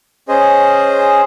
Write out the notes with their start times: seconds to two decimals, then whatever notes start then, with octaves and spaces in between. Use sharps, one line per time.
0.29 C#4 G#4 C5 D#5